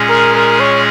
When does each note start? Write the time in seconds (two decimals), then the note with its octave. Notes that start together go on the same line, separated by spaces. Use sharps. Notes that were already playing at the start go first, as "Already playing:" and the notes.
Already playing: A#2 G#3 C#4 G#4
0.09 A#4
0.35 A#4
0.60 C#5